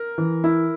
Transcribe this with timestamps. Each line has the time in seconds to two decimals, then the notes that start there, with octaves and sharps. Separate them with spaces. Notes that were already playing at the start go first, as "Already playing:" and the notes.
Already playing: A#4
0.18 E3
0.44 E4